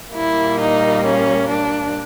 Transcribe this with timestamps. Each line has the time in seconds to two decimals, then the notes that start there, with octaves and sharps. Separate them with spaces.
0.14 A#2 G3 A#3 E4
0.59 D#4
1.04 C#4
1.48 D4